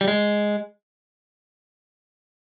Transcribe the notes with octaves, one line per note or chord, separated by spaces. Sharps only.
G3
G#3